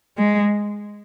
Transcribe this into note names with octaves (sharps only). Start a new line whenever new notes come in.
G#3